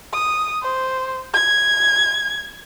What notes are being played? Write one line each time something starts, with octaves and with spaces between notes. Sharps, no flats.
D#6
C5
G#6